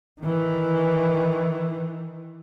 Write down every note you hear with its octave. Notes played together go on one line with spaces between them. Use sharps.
D#3 E3